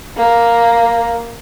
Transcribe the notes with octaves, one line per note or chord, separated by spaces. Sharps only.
A#3